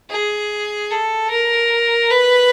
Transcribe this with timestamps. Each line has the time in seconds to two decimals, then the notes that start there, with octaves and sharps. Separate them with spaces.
0.10 G#4
0.90 A4
1.30 A#4
2.10 B4